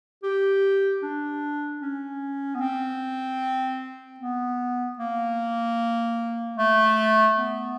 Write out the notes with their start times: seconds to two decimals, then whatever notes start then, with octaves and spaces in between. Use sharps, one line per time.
0.23 G4
1.02 D4
1.81 C#4
2.55 B3
2.60 C4
4.20 B3
4.98 A#3
6.58 A3
7.37 B3